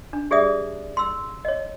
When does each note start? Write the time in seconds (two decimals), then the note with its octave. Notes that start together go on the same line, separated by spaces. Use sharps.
0.13 D4
0.31 G4 G#4 D5 E5 D#6
0.97 C6 E6
1.45 C#5 D#5